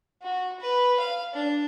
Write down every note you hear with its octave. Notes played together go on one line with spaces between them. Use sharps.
F#4
B4
F5
D4